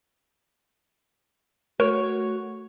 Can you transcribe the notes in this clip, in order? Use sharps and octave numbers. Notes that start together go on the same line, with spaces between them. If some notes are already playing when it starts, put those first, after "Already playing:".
A3 F#4 A#4 C#5